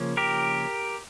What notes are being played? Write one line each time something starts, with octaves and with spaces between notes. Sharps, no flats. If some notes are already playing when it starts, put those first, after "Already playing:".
Already playing: C#3 F3 A#3 C#4
G4 A#4